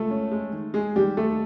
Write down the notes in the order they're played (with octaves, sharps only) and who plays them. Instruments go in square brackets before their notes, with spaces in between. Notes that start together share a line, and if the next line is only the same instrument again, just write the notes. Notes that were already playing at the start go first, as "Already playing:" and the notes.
Already playing: [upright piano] C#2 A3 A4
C#4
G#3
D#3
G#3 G#4
D#3 G3 G4
D#2 A3 A4